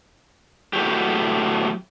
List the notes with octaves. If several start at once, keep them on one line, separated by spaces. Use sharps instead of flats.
A2 F#3 F#4 G4